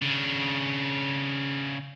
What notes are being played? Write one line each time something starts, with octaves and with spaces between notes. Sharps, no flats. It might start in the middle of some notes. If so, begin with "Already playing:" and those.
C#3 D4